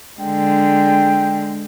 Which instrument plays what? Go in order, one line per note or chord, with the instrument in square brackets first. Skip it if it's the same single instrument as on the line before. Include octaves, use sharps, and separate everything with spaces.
[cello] D3 G#3 [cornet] G5